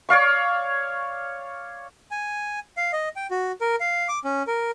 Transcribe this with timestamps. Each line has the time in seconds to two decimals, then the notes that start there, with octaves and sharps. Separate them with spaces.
0.09 C#5 D5 F5 C#6
2.11 G#5
2.77 F5
2.93 D#5
3.16 G5
3.31 F#4
3.61 A#4
3.80 F5
4.08 D6
4.25 C#4
4.47 A#4